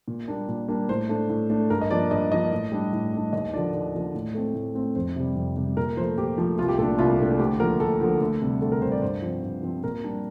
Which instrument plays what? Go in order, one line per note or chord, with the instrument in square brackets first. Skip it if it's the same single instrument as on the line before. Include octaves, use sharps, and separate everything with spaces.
[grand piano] A#2
G3 A#3 D4
A#2
G3 A#3 D4
A2 C5
A3 D4
A2
A3 D4
G2 A#4
D#5
F3 A#3 D4 D5
G2 D#5
F3 A#3 D4 D#5
A2
G3 D4
A2
G3 D4
D#2 D#5
D3 F3 A#3 D4 D5
D#2 D5
D3 F3 A#3 D4
A2
A3 C4
A2
A3 C4
F2 C5
C3 G3
F2
C3 G3
A#2 A#4
F3 A3 C5
A#2 G4
F3 A3
C2 F4
G4
A#2 A3 D4 A4
C2 F4
A#2 A3 D4
D2 G4
D3 F3 A#3 A#4
D2 A4
D3 F3 A#3
D2
C3 G3
D2 A4
A#4
C3 G3 C5
D5
G2 C5
F3 C4
G2
F3 C4
A#2 A#4
G3 D4